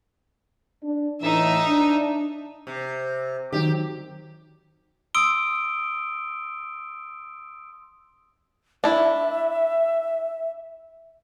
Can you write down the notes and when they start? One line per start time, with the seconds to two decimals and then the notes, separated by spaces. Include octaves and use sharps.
0.83 D4
1.22 A2 E3 D#4 E5
1.67 D4
2.67 C3
3.53 D#3 F#3 G4
5.15 C6 D#6 E6 D7 G7
8.84 D4 E4 E5